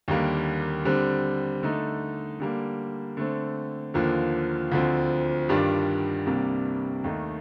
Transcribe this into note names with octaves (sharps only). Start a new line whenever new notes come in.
D#2 D3 G3 A#3
D3 G3 C4
D3 A3 D#4
D3 G3 A#3
D3 A3 C4
D#2 D3 F3 A#3
D2 D3 F3 C4
G2 D#3 G3 D4 F4
C2 C3 G3 A#3 D4
D#2 D#3 A3 D#4